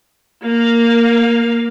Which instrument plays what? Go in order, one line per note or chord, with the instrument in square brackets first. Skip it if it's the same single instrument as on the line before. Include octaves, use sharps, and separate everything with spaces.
[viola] A#3 F5